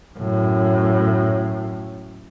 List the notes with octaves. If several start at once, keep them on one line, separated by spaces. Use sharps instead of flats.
F#2 A2